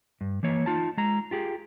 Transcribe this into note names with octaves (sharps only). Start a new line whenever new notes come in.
G2
E3 A#3 C#5
D#4 F4 A5
G#3 A#5
F4 G4 G#4